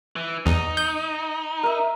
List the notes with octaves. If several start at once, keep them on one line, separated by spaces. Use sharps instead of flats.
E3
E2 D#4
G6
A#4 E5